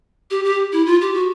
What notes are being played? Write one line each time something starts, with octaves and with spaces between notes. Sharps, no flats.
G4
G4
E4
F4
G4
F#4